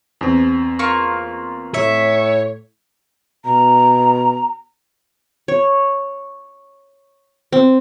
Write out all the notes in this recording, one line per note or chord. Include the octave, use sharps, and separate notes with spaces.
E2 C4
A#3 F4 C#6
A2 C#5 E5
B2 A#5
C#5
C4